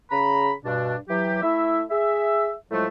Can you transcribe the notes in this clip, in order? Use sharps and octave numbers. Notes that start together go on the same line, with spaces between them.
C#3 A#5 B5
G2 B2 D4
E3 F#3 G4
A3 E4 E5
G#4 E5
A2 F3 F#3 G#3 A3